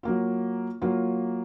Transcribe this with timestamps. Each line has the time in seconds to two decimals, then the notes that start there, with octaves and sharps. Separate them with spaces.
0.03 F#3 A#3 F4
0.82 F#3 A#3 F4